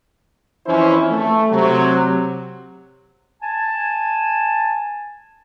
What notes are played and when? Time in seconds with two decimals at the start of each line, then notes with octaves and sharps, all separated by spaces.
0.67 F2 E3 C#4 E4 C5
1.11 A3
1.50 C3 F#3
3.42 G#5 A5